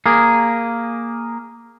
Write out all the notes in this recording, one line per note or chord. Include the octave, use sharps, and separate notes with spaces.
A#3 G#4